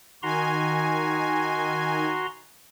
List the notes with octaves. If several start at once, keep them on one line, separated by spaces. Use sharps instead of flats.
D#3 F#4 G#5 A#5 C6